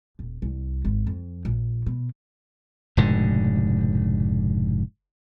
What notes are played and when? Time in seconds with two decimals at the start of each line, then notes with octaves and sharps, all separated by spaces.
0.19 D#1
0.42 C2
0.85 G#1
1.07 F2
1.45 A#1
1.86 B2
2.97 F1 G#2 B2 D3